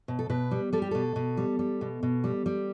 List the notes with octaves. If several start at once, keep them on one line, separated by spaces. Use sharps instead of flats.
B2
A4
B2 B4
G3
G3 A4
G4
B2 A4
B2
G3
G3
B2
B2
G3
G3